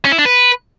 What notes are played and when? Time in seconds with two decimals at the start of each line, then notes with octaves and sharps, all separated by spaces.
0.05 C#4
0.12 E4
0.19 D4
0.25 B4